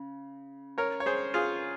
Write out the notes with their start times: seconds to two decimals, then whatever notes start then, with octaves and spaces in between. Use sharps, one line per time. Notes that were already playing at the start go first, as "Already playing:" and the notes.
Already playing: C#3
0.78 A#4 C#5
1.00 C#5
1.06 G#4 C5
1.34 F4 G#4